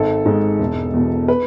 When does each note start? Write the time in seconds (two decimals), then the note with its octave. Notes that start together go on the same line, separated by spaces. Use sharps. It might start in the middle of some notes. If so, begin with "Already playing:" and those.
Already playing: G#1 A4
0.25 G#2 G#3
0.59 E1
0.94 E2 B2
1.28 B4